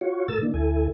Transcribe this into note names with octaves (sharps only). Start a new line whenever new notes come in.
F4 F#4 C#5
A2 A4 A#4 E6 A6
D#3 E3 A#3 D4
D2 E4 A4 G#5